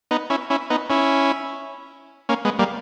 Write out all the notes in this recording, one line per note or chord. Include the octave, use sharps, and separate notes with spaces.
B3 D#4
C#4 E4
C#4 E4
B3 D#4
C#4 E4
A#3 C#4
G#3 B3
G3 A#3